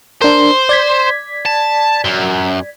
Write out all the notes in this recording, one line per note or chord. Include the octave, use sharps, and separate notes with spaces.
D4 A#4 C5
D5 G#6 B6
A5
F#2